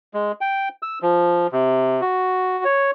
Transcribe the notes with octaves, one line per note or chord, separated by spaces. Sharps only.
G#3
G5
E6
F3
C3
F#4
C#5